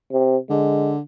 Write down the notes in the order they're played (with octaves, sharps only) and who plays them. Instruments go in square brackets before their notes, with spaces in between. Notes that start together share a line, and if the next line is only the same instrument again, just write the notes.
[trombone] C3
[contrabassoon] D3 [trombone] G#3